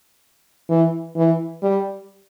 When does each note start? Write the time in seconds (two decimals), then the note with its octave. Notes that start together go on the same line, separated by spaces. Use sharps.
0.69 E3
1.16 E3
1.63 G3